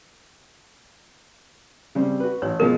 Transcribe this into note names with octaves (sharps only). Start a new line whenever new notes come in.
C#3 G3 C4
F#4 B4
A1 C#5
B2 F3 G#3 A#4